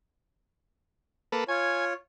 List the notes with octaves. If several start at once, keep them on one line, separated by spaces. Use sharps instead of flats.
A#3 A4 B4
F4 C#5 G#5